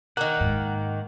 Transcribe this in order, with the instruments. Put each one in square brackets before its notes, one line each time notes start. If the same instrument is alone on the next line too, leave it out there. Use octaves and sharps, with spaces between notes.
[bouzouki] D#3 A#3 [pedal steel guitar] F#5
[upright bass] G#2